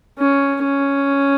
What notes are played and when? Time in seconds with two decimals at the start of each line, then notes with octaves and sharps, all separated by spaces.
0.19 C#4
0.63 C#4